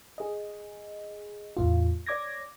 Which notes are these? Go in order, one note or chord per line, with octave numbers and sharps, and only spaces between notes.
G#4 D#5
E2 A2 F4
C#5 D5 D6 G#6 A#6